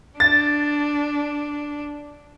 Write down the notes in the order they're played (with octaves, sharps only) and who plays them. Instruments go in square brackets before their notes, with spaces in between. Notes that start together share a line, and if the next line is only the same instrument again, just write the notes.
[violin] D4 [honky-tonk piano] A6